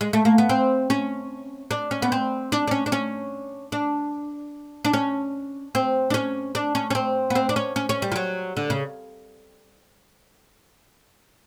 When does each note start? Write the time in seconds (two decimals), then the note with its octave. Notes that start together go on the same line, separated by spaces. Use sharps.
0.01 G#3
0.13 A3
0.25 A#3
0.38 B3
0.49 C4
0.90 C#4
1.71 D4
1.91 C#4
2.02 B3
2.12 C4
2.52 D4
2.68 D4
2.71 C#4
2.86 D4
2.92 C#4
3.72 D4
4.85 D4
4.93 C#4
5.75 C4
6.10 D4
6.14 C#4
6.55 D4
6.75 C#4
6.90 C#4
6.95 C4
7.30 B3
7.35 C4
7.49 D4
7.56 C#4
7.76 C#4
7.89 C#4
8.02 G3
8.12 F3
8.16 F#3
8.57 D3
8.70 C#3